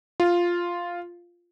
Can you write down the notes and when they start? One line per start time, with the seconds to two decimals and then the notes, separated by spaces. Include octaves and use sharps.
0.20 F4